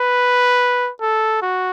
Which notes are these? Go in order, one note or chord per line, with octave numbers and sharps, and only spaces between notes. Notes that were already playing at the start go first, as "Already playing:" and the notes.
Already playing: B4
A4
F#4